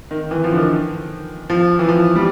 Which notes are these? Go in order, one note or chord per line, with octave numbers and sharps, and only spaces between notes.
D#3
E3
F3
D3
D#3
F3
E3
F3
G3